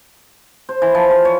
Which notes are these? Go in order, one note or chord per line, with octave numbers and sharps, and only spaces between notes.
C5
E3
F3
F4
C#5